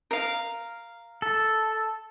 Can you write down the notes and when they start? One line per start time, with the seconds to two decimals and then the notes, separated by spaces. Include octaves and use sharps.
0.11 A#4 F5
1.22 A4